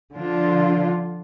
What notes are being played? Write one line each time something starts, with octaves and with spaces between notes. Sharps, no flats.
D3 F3 D4 F4